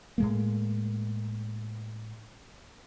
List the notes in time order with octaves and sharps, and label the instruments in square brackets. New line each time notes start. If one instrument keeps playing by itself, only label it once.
[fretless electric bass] A2 G#3 A#3